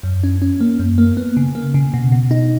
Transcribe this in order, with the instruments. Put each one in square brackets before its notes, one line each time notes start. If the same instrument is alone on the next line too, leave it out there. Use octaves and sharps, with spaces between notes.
[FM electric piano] F#2
C#4
C#4
A#3
F#2
A#3
B3
C#3
A#3
C#3
B2
B2
D#4